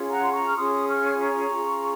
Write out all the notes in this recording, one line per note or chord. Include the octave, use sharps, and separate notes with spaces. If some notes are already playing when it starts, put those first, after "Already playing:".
Already playing: C#4 F4 G#4
F#5 A#5
C6
A#5 C#6
F6
C#4 F4 G#4 C6 D#6
C#6 F6
A#5 C#6
C#4 F4 G#4